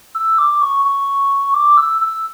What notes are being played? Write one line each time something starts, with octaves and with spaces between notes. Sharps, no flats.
E6
D6
C#6
C#6
D6
E6
E6